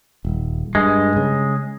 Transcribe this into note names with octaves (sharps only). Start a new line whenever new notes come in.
D#1
G2 G#3
C#3